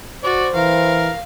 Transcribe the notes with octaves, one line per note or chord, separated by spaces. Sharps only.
F#4 C5 D5
E3 A#4 F5